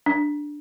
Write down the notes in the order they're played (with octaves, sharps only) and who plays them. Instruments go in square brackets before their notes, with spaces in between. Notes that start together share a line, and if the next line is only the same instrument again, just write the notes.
[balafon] D4